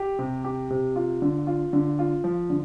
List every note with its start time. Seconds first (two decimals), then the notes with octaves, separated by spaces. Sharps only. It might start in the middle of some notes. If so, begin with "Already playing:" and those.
Already playing: G4
0.19 C3
0.44 G4
0.70 C3
0.96 F4
1.22 D3
1.47 F4
1.73 D3
1.99 F4
2.24 F3
2.50 D3